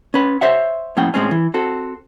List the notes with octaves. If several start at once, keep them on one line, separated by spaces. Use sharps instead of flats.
C#4 B4
C5 C#5 E5 F#5
A2 F3 A#3 C#4 F#5 G5
A2 G#3 C4 C#4
E3
C4 F#4 A4